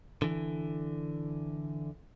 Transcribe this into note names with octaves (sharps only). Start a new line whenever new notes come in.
D3 E3